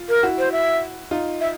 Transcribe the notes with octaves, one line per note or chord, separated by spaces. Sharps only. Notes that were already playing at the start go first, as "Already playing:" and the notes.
Already playing: F4
A#4
E4 F#4
C5
E5
D#4 F4
E5